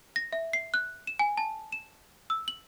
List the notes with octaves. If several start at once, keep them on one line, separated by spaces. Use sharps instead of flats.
A#6
E5
C7
F#6
E7
G#5
A5
E7
E6
F#7